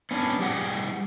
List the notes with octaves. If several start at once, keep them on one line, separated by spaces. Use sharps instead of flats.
B3 C#4 D4
G3 G4 G#4 F#5